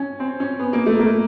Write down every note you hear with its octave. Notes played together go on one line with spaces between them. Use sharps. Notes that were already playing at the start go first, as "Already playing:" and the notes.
Already playing: C#4
C4
C#4
B3
A#3
A3
A#3